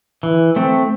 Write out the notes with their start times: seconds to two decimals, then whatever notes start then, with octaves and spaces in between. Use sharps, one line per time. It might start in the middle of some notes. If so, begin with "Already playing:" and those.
0.23 E3
0.56 A3 C4